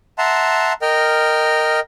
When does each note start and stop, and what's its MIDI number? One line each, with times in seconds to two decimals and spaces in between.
0.18 0.73 76
0.18 0.73 78
0.18 0.73 81
0.18 0.73 82
0.18 0.73 84
0.82 1.80 70
0.82 1.80 75
0.82 1.80 79
0.82 1.80 89